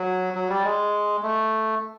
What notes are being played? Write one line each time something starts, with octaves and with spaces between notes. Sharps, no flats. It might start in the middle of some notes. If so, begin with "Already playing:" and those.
Already playing: F#3
F#3
G3
G#3
A3